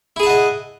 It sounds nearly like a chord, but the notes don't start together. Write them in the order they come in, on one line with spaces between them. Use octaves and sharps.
E4 G#4 A5 F#5 D#5